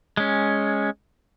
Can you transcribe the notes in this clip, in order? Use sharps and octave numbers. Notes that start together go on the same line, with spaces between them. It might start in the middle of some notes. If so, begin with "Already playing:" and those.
G#3 C#4